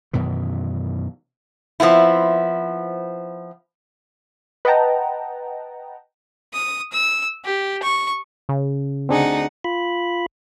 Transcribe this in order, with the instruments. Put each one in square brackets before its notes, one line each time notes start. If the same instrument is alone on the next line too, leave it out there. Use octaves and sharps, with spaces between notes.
[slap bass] F#2 B2 D#3 E3
[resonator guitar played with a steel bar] F3 B3 C4 E4
[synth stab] B4 D#5 F#5 G5 A5 A#5
[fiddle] D#6
E6
G4
C#6
[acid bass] C#3
[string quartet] D2 D#4 F#5 [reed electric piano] C4 D4 G#4
[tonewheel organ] F4 B5